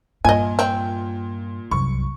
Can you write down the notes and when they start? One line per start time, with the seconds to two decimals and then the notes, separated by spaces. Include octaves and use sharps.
0.25 G2 A#2 D#5 G#5
0.59 C4
1.71 C2 F#2 C#6